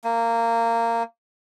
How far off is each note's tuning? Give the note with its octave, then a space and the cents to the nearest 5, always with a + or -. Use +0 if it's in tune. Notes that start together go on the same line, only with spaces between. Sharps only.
A#3 -15